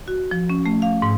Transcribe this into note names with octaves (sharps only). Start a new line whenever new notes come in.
F#4
F3
C#4
A3
F5
G#2